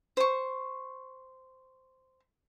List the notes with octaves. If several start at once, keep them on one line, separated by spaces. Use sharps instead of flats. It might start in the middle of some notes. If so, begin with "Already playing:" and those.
C5 C#6